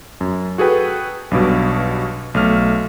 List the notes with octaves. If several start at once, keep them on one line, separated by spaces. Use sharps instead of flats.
F#2
F#4 G#4 A4 B4 G5
B1 G2 B2
B1 A3 F6